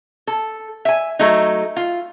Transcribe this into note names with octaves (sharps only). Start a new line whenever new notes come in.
A4
E5 G#5
F#3 A3 D#4
F4